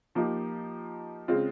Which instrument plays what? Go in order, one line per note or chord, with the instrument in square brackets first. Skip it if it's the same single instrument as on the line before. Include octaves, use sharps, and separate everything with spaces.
[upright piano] F3 A#3 D#4 G4
C#3 G#3 C4 F4